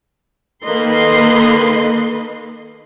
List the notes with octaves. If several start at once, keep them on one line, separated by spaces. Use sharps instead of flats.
D#3 A#3 A4 B4 D#5 C6